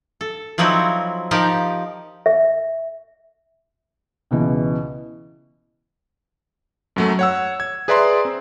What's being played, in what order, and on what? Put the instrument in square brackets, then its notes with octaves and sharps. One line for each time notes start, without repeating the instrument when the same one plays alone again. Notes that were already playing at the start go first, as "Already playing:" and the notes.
[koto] A4
F3 F#3 C4 D#4 E4 F#4
F3 D#4 G4 A#4
[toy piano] E5
[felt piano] C#2 B2 E3
[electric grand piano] F#2 F#3 A3
C#5 F#5 E6
G#6
G#4 B4 D5 E5 A#5 C6
C4